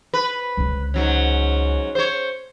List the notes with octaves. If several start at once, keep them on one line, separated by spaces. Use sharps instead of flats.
B4
C#2 D3
G#2 F#3 C#4
C5 C#5